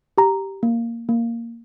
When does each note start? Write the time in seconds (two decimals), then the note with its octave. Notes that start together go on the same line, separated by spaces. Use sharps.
0.18 G4 A#5
0.63 A#3
1.09 A#3